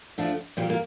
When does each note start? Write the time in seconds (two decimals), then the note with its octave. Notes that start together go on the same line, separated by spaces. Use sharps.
0.18 D3 F3 A3 D4
0.57 A#2 G3 A#3 C4
0.70 A#3